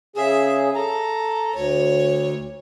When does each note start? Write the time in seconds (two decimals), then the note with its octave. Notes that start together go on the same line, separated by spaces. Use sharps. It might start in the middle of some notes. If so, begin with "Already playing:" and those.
0.16 C#3 G#4 E5
0.75 A4 A#5
1.55 D2 C#5